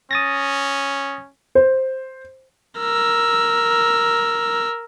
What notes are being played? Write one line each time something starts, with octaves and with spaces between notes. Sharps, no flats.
C#4 D#6 A6 A#6
C5
A#4 E6